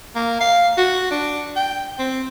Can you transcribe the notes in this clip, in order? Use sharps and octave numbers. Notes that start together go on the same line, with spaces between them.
A#3
F5
F#4
D4
G5
C4